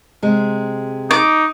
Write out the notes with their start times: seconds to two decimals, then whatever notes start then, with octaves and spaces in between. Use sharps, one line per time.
0.22 C3 G#3
1.11 D#4 D6